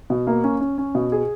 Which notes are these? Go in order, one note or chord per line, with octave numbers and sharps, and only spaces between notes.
B2
A#3
C#4
C#4
C#4
B2
G#4